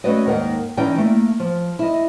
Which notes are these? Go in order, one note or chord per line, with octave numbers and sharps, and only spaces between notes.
A3 C#4 F#4 B4 D5 D#5
D#2 G#2 D#3 A#4 D#5 F#5
E3 C#4 D#4 D5 G5
A3 A#3
F3
E4 D#5